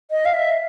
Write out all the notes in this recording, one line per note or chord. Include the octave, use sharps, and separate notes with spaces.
D#5
F5
E5